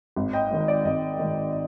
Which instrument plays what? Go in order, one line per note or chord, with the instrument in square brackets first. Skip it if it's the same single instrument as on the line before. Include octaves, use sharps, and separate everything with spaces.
[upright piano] G#1
D#5 G5
G#2 D#3
D5
G#1 D#5
G#2 D#3